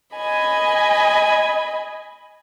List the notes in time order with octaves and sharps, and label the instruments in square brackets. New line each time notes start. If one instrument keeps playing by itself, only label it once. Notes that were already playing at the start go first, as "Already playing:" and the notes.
[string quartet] D#5 G#5 B5